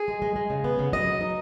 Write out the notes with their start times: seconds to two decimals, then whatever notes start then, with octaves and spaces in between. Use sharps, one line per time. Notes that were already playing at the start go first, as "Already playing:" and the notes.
Already playing: G#4
0.08 G#3
0.22 G#3
0.36 G#3
0.50 C#3
0.64 B3
0.79 C#3
0.92 F#3 D#5
1.07 F#3
1.21 D#4